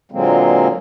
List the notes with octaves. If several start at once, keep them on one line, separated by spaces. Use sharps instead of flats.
A#2 D3 F#3 G#3 A#3 C4